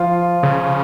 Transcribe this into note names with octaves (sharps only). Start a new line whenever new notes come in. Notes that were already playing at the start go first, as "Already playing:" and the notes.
Already playing: F3 F4
C#3